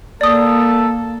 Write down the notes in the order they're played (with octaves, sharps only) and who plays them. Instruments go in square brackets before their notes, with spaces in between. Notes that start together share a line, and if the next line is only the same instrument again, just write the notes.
[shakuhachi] A#3 [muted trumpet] A4 [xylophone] D5 D#6